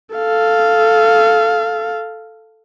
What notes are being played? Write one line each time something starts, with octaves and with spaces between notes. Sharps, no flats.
A4 F5